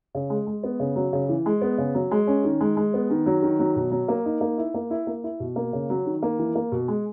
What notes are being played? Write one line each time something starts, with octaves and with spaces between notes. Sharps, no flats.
C#3
G#3
G#3
B3
C#3
F#3
C#3
E3
G#3
B3
C#3
F#3
G#3
C#4
D#3
G#3
G#3
B3
D#3
F#3
D#3
F#3
B2
F#3
A#3
D#4
A#3
E4
A#3
E4
A#3
E4
B2
A#3
C#3
F#3
D#3
A#3
E3
A#3
B2
G#3